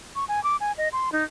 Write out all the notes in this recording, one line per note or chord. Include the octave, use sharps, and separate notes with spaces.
C#6
G#5
D6
G#5
D#5
C6
D#4